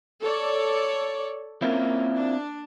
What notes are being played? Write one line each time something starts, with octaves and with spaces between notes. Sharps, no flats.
A4 C#5 D5
A#3 C4 C#4 E4 F4
D4